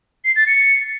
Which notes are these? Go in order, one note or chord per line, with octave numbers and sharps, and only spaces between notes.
C7
A6
C#7